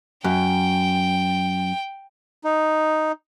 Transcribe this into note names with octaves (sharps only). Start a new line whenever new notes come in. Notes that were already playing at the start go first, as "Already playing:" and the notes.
F#2 G5
D#4